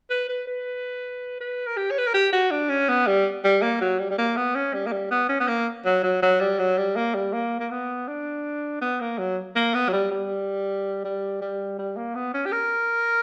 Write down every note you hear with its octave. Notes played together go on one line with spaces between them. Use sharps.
B4
B4
B4
B4
A#4
G4
C#5
B4
A#4
G4
F#4
D4
C#4
B3
G3
G3
A#3
F#3
G3
G3
A#3
B3
C#4
G3
A#3
G3
B3
C#4
B3
A#3
F#3
F#3
F#3
G3
F#3
G3
A#3
G3
A#3
A#3
B3
D4
B3
A#3
F#3
A#3
B3
F#3
G3
G3
G3
G3
G3
A#3
B3
C#4
G4
A#4